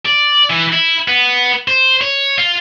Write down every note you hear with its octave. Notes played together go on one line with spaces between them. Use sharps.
D5
E3
E4
B3
C5
C#5
F4